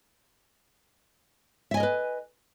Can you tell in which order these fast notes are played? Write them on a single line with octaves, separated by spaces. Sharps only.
E5 G#5 D#5 A#4 B4